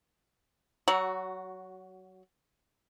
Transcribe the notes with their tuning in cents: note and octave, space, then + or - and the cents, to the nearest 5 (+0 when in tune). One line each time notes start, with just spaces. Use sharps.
F#3 +20 F#4 +0